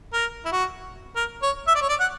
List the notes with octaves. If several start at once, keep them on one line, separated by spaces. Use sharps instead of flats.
A#4
E4
F#4
A#4
C#5
E5
D5
C#5
D5
F#5